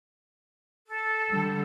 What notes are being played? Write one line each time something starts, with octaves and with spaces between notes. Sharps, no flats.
A4
D3 G3